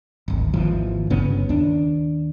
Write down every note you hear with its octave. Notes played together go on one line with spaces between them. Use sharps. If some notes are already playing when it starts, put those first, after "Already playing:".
D1 G#1
G#1 D#2 E3 F3
G1 C#3 B3 C#4
D#2 D4